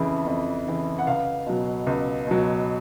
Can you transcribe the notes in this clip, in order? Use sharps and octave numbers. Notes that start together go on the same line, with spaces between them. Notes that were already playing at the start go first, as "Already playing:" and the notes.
Already playing: F2 C#3 E3
F2
C#3 E3
F#5
C#2 F5
B2 F#3
C#2
B2 F#3